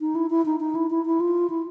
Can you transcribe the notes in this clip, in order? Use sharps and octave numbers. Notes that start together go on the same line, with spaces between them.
D#4
E4
E4
D#4
D#4
E4
E4
E4
F4
E4